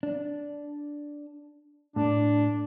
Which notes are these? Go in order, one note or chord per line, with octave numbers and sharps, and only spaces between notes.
D4
A2 D4